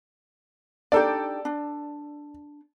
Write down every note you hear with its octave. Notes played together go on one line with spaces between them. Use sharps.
D4 D#4 G4 A4 D5
D4